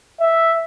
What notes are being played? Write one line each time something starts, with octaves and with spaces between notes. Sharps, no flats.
E5